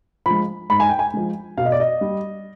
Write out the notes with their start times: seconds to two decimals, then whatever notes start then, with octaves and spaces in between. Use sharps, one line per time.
0.26 F3 G#3 B5
0.70 G#2 B5
0.80 G#5
0.89 G5
0.99 G#5
1.14 F3 G#3
1.57 B2 F5
1.65 D#5
1.72 D5
1.80 D#5
2.01 G3